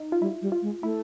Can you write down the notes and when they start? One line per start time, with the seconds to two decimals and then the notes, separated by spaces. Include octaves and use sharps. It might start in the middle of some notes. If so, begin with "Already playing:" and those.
Already playing: D#4
0.12 F4
0.21 G3 E4
0.42 G3
0.52 F4
0.62 G#3
0.83 A3 E4